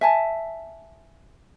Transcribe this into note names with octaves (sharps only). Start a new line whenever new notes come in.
E5 G#5 A5